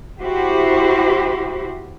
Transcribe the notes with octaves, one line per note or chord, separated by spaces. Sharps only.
E4 F#4 G4 C5